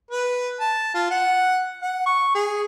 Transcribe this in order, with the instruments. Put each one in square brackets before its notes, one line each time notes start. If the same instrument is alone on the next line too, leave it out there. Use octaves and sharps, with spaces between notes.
[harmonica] B4
A5
F4
F#5
F#5
C#6
G#4